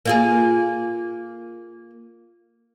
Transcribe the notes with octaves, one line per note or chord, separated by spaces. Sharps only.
A#3 F4 G#4